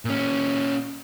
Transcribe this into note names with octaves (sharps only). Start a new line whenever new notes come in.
A#2 C#4